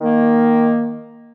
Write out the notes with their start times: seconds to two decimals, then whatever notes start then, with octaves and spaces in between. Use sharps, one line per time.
0.01 D#3 A#3